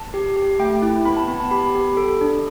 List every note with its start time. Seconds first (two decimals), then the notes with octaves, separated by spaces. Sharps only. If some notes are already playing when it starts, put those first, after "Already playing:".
Already playing: A5
0.14 G4
0.36 G4
0.59 A3 G5
0.82 E4
1.05 B3 B5
1.17 A5
1.28 B3 B5
1.40 A5
1.51 G4 B5
1.75 G4
1.97 A4
2.21 D4